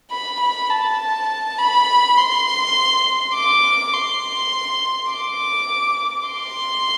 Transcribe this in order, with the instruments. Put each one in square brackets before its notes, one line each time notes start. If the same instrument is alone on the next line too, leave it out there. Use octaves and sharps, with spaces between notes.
[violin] B5
B5
A5
B5
C6
D6
C6
D6
C6